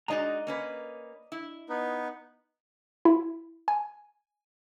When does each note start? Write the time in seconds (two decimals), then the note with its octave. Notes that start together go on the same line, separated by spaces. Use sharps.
0.08 G#3 D#4 F#4 D5 D#5 A#5
0.47 A#3 C#4 B4
1.32 E4
1.69 B3 D#4 B4
3.05 E4
3.68 G#5